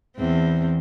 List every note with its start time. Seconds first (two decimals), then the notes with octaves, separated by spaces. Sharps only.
0.17 E2 C4